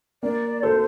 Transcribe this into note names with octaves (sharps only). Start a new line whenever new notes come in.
A#3 D5
A4 C5